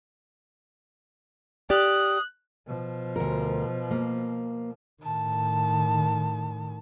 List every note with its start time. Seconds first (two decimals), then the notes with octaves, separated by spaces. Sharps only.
1.70 G4 D5 D#6 F#6
2.67 B2 F3
3.16 D2 A#4
3.91 A#3
5.03 A2 D#3 A5